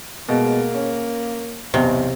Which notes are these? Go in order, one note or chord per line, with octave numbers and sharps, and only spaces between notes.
B2 G#3 A#3
C#4
B1 E2 C3 C5